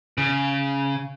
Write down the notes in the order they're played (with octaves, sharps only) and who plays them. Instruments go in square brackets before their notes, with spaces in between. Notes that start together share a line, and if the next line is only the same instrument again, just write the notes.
[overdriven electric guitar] C#3